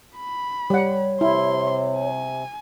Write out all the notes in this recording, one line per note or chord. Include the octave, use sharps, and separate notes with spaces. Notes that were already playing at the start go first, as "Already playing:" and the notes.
B5
G3 C#5 F#5
C3 E4 C6
G#5